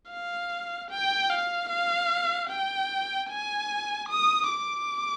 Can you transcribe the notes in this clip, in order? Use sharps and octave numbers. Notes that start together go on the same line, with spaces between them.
F5
G5
F5
F5
G5
G#5
D#6
D6